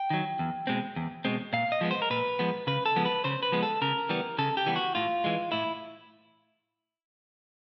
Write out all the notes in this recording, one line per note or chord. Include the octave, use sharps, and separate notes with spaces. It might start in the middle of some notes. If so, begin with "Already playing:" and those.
Already playing: G5
D#3 F#3
E2
B2 G#3 C4
E2
B2 G#3 C4
A#2 F5
D#5
F3 G#3 B3
C5
A#4
A#2 B4
F3 G#3 B3
C#3 B4
A4
F3 G#3 B3
B4
C#3 C5
B4
F3 G#3 B3
A4
C#3 A#4
E3 G3 B3
C#3 A4
G4
E3 G3 B3
F#4
A2 F4
E3 G#3
A2 E4